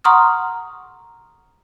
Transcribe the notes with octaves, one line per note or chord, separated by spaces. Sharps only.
F#5 A#5 C6 C#6 D#6 F6